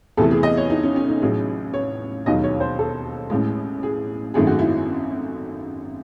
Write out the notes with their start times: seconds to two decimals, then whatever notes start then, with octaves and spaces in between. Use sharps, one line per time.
0.17 E2 C3 E3 A3 A4
0.31 G#4
0.43 D#5
0.57 C#5
0.70 D#4
0.83 C#4
0.96 C#4
1.09 D#4
1.22 A1 A2 F#3 G#4
1.74 C#5
2.26 E1 D#2 D#3 F#3 D#5
2.44 C#5
2.60 C5
2.79 A4
3.30 A1 A2 G#3
3.83 G#4
4.34 G#1 F#2 D#3 A3 G#4
4.47 F#4
4.59 E4